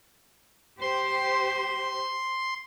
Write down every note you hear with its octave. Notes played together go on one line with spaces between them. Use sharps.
G4 C5 C6